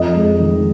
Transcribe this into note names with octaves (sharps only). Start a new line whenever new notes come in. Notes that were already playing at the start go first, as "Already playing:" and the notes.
Already playing: F2 D#5
G#3
D#3